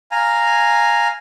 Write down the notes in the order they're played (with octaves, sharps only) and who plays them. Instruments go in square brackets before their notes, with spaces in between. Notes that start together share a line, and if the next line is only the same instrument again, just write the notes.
[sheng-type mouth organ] F5 G#5 A#5